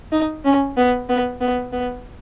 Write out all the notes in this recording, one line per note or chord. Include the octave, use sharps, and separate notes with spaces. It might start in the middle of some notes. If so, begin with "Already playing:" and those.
D#4
C#4
B3
B3
B3
B3